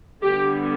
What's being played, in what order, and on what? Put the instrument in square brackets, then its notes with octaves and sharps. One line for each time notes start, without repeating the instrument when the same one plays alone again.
[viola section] D3 G3 B3 G4